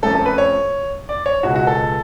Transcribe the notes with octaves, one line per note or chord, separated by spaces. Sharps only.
F2 F3 A3 C#4 A4
A4
B4
C#5
D5
C#5
C#2 B2 G#3 F#4
F#4
A4